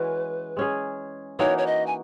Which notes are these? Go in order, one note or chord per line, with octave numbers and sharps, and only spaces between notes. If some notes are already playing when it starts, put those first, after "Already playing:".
Already playing: E3 G#3 C#4 F#4 B4
G#3 C#4 G#4
E3 A#3 D#4 F#4 C#5
C#5
D#5
G#5